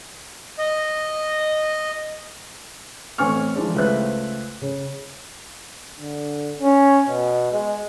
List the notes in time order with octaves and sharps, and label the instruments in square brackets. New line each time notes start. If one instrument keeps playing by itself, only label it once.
[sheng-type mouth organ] D#5
[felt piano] A1 C4 G#5 C#6 F6
E3 F3 G#3 D4
C#2 A3 B4 C5 E5 F#6
C#3
[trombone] D3
C#4
B2
G#3